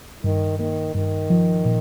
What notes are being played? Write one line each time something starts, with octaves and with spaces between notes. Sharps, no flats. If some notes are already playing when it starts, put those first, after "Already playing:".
G2 D#3
D#3 A#3
G2 D#3
F3
A#2